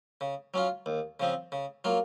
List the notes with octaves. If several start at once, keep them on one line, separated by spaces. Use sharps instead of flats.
C#3
F#3 C#4 F4
D#2
C#3 F3 C4
C#3
F#3 A#3 F4